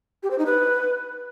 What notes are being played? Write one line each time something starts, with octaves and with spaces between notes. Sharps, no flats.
G4
C5
D#4
B4